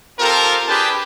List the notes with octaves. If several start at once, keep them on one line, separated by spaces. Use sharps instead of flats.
C4 F4 G4 A4 A#4
D4 G4 G#4 B4 G5 A5